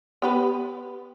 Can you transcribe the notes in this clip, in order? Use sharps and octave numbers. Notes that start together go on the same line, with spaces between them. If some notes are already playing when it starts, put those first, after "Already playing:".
B3 G4 B4